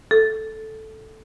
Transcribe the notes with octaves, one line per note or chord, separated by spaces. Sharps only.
A4